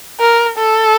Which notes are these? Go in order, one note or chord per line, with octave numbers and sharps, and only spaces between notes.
A#4
A4